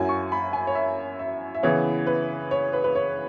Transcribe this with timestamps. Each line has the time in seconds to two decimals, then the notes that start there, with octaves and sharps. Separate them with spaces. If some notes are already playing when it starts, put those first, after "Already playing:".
Already playing: F#2 F#3 E4 G#5
0.09 C#6
0.32 B5
0.53 G#5
0.67 C#5
0.75 E5
1.19 E5
1.55 E5
1.63 C#3 E3 B3 E4 C#5
2.07 B4
2.51 C#5
2.73 B4
2.84 B4
2.95 C#5